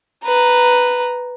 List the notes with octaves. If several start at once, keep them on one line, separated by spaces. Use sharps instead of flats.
B4 A#5